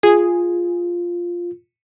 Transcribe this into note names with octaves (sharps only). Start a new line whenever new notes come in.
F4 G#4